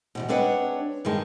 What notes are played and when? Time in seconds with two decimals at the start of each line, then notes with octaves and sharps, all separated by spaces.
0.15 E2 G#2 B2
0.29 G#3 C4 D4 B4 C#5 F#5
1.05 G2 D#3 G#3 A5